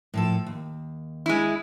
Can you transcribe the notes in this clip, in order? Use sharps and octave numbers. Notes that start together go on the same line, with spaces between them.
A2 F3 A4
D#2
G#3 E4